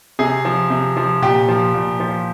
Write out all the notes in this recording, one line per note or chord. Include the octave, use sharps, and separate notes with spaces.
C3 G#4
F3
C3
F3
A#2 G4
F3
A#2
F3